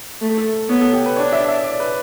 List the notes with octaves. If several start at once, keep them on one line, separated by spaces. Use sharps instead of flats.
A3
A4
B3 C#5
A4
G4
B4
D4 C#5
E5
E5
D5
B4